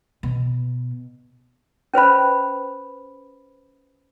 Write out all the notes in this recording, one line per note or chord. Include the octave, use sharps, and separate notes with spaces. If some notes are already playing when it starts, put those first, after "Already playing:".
B2
C#4 B4 C5 B5